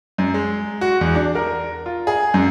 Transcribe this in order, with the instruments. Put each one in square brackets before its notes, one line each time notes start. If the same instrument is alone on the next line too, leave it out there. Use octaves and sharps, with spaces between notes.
[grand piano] F#2
G#3
F#4
E2
D4
A#4
F4
G#4
F#2